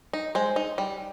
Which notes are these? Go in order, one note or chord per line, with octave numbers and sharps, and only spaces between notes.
D#4
G#3 C5
D#4
G3